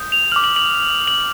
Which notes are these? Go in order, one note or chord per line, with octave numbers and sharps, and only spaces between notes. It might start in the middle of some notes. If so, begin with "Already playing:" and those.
Already playing: D#6 G6
F7
D6 F6 F#7
F#7
F#7
F#7